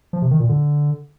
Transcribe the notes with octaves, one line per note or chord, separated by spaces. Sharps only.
F3
C3
D#3
A#2
D3